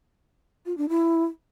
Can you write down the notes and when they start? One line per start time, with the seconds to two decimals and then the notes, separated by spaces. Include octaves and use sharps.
0.66 F4
0.78 D4
0.89 E4